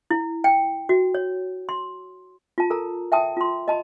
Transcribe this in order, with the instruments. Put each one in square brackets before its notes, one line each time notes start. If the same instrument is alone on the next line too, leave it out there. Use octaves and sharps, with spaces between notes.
[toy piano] E4
G5
F#4
C#5
C6
F4 A5
A4 A#4 A#5
E5 G5 A5 D#6
F4 C6
D#5 A5 B5